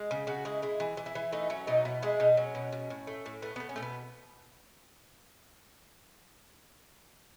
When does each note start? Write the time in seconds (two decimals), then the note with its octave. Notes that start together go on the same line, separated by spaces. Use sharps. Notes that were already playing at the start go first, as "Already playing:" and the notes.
Already playing: G#3
0.11 C#3
0.27 C#3 F#4
0.45 G#3 E4
0.62 G#3 E4
0.80 E3
0.97 E3
1.06 E4
1.15 E3
1.32 A3 D#4
1.50 F#3 C#4
1.67 B2 D#4
1.85 B2 E4
2.02 G#3 E4
2.20 B2 D#4
2.37 F#3 C#4
2.55 B2
2.72 B2
2.90 A2
3.07 A3
3.26 A2
3.42 A3 B3
3.56 A3 B3
3.69 C#4
3.76 B2 A3
3.83 B3